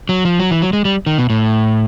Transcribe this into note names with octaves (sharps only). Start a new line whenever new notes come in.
F#3
F3
F#3
E3
F#3
G#3
G3
D#3
B2
A2